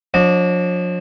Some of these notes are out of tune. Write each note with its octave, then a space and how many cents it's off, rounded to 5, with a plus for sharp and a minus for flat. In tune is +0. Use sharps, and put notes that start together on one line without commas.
F3 +45 D4 -20 D#5 -30